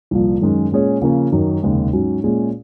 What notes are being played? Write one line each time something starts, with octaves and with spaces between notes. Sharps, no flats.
C2 A#2 F3
F#2 D#3 G#3 C#4
A#2 G#3 C#4 G#4 C#5
C#3 F3 A#3 C#4
F#2 D#3 F#3
F1 D#2 C#3 G#3
G#2 F#3 C#4
A#2 G#3 C#4 G#4